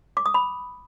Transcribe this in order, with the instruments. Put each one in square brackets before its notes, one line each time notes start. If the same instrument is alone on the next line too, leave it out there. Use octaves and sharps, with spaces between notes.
[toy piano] D6
D#6
B5